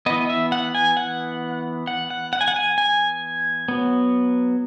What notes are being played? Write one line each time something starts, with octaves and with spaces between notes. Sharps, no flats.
E3 B3 D#5
E5
F#5
G#5
F#5
F#5
F#5
F#5
G#5
F#5
G#5
G#5
F#3 B3